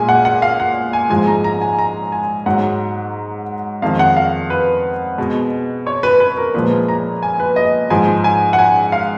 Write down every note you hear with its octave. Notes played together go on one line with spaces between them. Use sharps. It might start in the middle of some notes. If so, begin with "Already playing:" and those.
Already playing: A#2 G#3 G#5
F#5
F#5
F5
F#5
G#5
G#2 F3 G#3 G#5
A#5
A#5
G#5
A#5
G#5
G#2 F#3 F#5
F2 D#3 G#3 F5
F#5
F5
B4
B2 G#3
C#5
B4
B4
A#4
A#2 F3 G#3 B4
A#5
G#5
B4
D#5
G#2 F3 G#3 G#5
G#5
F#5
G#5
F5